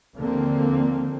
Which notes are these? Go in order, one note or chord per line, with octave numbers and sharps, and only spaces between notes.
D#2 D3 F3 A#3 C4